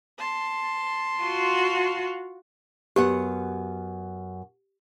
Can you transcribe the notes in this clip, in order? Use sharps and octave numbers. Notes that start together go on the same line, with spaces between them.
A5 C6
F4 F#4
F#2 B3 G4 F#5